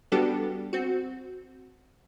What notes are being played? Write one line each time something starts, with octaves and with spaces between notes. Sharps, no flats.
G3 B3 D4 F#4 G4 A4
C4 F#4